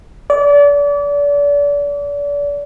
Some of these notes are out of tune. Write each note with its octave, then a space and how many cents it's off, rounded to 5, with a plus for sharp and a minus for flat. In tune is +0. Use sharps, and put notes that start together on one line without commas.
D5 -35